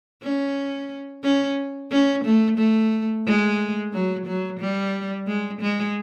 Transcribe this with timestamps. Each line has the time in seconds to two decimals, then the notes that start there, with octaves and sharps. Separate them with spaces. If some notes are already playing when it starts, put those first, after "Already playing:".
0.23 C#4
1.24 C#4
1.91 C#4
2.24 A3
2.58 A3
3.26 G#3
3.93 F#3
4.26 F#3
4.60 G3
5.27 G#3
5.61 G#3